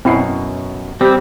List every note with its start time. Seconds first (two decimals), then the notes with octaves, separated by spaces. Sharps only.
0.05 F#2 B2 C4 E4 C7
1.01 G3 C4 G4